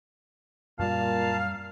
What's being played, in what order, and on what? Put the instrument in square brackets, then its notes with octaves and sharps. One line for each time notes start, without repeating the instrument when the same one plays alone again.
[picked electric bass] F#2 G3 [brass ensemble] A#2 [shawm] F5 [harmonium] A5